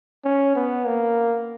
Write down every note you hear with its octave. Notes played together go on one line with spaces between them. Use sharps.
C#4
B3
A#3